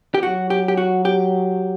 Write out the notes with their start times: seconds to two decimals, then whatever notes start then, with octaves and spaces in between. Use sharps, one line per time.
0.14 G4
0.23 F#3 F#4
0.50 G4
0.68 G4
0.77 F#4
1.05 G4